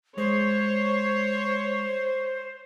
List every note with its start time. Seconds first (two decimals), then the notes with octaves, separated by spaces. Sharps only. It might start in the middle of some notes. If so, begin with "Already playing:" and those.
0.18 G#3 C5 C#5